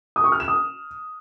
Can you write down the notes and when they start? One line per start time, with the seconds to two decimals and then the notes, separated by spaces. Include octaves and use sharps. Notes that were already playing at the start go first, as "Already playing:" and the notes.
0.16 D#6
0.24 C#6
0.32 F6
0.40 E7
0.48 D#6